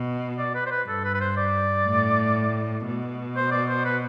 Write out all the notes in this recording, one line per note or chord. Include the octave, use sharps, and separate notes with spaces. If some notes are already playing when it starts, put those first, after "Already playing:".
Already playing: B2
D5
B4
C5
B4
G2 A4
B4
B4
C5
D5
A2
B2
C5
D5
C5
B4